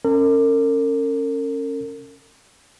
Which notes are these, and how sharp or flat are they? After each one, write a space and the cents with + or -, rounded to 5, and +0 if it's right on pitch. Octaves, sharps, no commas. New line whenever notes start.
C#4 -15 A#4 -40